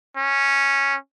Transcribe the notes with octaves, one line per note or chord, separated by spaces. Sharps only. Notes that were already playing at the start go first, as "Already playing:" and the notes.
C#4